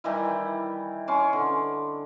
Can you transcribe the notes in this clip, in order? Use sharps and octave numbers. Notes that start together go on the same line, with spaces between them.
D#3 E3 G3 E4
C#4 C6 D6
D3